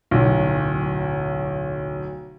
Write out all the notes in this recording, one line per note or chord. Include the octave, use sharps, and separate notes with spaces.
D1 B1